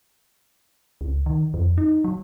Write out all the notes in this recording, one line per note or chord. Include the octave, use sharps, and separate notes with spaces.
C#2
D#3
F2
D#4
F#3